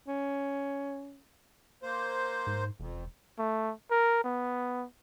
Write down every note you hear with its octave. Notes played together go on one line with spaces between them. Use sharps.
C#4
A#3 C5
G#2
E1 F2
A3
A#4
B3